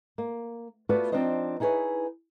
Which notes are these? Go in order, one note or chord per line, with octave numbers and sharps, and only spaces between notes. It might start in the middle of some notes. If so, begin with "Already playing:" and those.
A#3
A3 B3 F4 F#4 B4 D5
F3 C4 D4 D#4 C5 D#5
D#4 E4 G#4 A4 B4 C#5